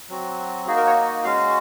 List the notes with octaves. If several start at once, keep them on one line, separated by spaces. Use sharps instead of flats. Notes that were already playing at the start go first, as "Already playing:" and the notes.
F#3 C4 F#4
A#3 D#4 F#4 G#4
A#4
C#5
D#5
G#3 C#4 F#4 F5